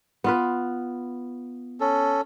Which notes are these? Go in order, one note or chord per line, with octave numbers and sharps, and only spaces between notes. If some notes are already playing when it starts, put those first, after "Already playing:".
B3 F4 B4
C#4 A4